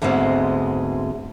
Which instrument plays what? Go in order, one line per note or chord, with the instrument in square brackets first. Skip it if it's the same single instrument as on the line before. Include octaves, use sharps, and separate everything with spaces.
[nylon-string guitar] D2 G#2 G#3 B3 C4